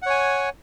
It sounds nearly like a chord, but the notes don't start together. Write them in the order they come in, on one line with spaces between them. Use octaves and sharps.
F#5 C#5 G#5